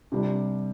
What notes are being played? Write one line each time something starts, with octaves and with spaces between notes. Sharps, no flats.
C3 G3 D4